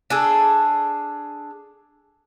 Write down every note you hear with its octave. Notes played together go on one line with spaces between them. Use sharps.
D4 G#4 A4